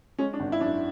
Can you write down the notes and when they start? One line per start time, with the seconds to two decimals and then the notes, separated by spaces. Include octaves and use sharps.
0.19 G#3 C#4
0.33 D4
0.40 G#1
0.52 E4
0.60 F#2 D4